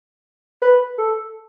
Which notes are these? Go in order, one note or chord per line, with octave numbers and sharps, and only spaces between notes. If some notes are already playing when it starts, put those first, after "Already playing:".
B4
A4